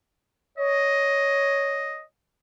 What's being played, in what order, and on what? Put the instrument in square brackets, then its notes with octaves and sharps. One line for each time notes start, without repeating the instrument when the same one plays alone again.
[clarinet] C#5 [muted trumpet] D#5